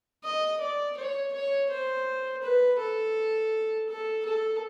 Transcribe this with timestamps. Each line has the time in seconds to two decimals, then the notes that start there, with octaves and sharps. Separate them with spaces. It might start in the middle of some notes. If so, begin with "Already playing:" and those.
0.24 D#5
0.60 D5
0.97 C#5
1.32 C#5
1.70 C5
2.43 B4
2.79 A4
3.89 A4
4.25 A4